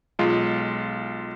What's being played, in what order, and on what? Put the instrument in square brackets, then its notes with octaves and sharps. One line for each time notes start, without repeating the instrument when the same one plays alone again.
[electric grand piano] B1 G#3 F4